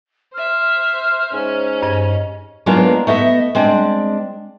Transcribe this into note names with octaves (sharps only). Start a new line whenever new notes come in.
C5 E5 F6
G#2 C#4
G2 D#5 G#6
F#3 G#3 A#3 B3 D4 F4
A3 B3 D#5 E5
G#3 C4 D4